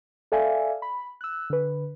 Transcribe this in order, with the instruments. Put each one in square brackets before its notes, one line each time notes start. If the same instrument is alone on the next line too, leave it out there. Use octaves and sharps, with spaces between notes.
[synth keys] A4 D5 E5 F5 G#5
B5
E6 F#6
D3 B4